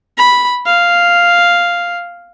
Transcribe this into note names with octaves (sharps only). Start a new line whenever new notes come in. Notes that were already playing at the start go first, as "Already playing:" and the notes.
B5
F5